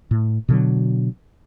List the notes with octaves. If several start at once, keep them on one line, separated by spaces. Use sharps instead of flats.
A2
B2 D3 F#3